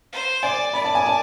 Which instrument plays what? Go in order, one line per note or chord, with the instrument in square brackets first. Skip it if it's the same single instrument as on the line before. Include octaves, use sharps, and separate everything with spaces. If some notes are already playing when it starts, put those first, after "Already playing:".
[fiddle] C5
[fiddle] D5 [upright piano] G#5
[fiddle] D5 [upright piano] B5
[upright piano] A5
G#5
A5